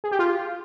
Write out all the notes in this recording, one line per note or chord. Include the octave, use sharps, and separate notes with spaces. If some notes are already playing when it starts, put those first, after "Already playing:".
G#4
G4
F4